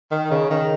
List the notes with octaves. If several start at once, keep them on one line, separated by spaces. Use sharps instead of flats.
D#3
C#3
D#3